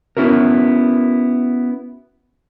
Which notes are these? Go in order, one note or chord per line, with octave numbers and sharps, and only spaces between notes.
B3 C#4 E4 F#4 A#4